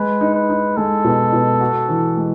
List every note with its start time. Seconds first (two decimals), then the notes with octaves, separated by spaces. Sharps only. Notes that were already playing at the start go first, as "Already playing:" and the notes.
Already playing: G#3 B4
0.21 D#4
0.34 B4
0.50 D#4
0.77 G#3 A4
1.04 B2
1.33 B2
1.60 F#4
1.89 E3
2.17 G#3